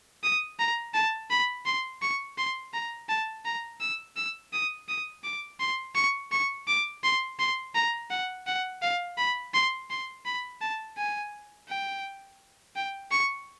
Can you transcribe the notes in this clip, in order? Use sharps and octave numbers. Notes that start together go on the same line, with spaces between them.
D#6
A#5
A5
B5
C6
C#6
C6
A#5
A5
A#5
E6
E6
D#6
D#6
D6
C6
C#6
C#6
D6
C6
C6
A#5
F#5
F#5
F5
B5
C6
C6
B5
A5
G#5
G5
G5
C#6